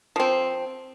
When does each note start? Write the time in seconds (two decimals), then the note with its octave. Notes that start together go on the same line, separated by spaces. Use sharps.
0.16 F3 C4